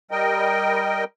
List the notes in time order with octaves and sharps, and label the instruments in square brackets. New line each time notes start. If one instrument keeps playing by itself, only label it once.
[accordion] G3 A#4 D#5 G5